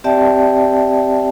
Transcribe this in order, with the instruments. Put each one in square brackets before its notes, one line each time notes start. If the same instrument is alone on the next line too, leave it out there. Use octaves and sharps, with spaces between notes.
[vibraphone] C4 G4 D5 E5 G5 A5